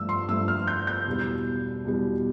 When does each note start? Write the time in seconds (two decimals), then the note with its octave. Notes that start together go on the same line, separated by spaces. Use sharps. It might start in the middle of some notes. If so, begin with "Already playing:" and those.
Already playing: G2 F3 A3 E6
0.09 C6
0.28 G2 F3 A3 E6
0.48 F6
0.67 G6
0.87 G6
1.07 E2 B2 G3
1.85 E2 B2 G3